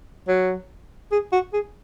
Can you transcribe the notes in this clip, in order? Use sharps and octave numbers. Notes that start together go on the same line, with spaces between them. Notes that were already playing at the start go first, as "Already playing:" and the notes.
F#3
G#4
F#4
G#4